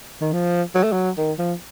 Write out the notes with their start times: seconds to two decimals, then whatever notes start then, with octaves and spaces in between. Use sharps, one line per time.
0.21 D#3
0.33 F3
0.75 F#3
0.83 A3
0.92 F#3
1.18 D#3
1.39 F3